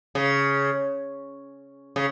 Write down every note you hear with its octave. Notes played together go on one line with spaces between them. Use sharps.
C#3
C#3